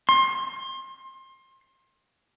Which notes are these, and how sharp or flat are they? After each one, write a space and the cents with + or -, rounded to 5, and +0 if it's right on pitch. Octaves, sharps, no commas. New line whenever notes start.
C6 +30